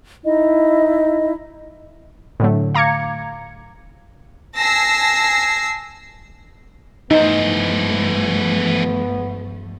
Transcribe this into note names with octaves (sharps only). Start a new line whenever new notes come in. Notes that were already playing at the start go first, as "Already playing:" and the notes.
D#4 E4 D#5
A2 D3 F#3 A3
F5 A#5 D6 G#6 C#7
G#5 A5 E6 A#6 C7
G2 E3 F3 A3 B3 D#4 C5